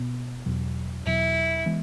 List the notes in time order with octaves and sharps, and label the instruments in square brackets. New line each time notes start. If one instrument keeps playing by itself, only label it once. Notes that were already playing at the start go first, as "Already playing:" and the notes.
Already playing: [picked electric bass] B2 B3
E2 B2 F#3
[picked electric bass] E2 B2 F#3 [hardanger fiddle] E4
[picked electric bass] E3 G#3 B3